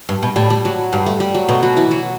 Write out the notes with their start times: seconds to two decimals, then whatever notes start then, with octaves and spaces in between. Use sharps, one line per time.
0.09 G2
0.23 B2
0.36 A2 G3
0.50 G3
0.65 F#3
0.92 G2 G3
1.06 A3
1.20 G3
1.34 F#3
1.49 B2 A3
1.63 F#3 F#4
1.77 E3 E4
1.91 F#3 F#4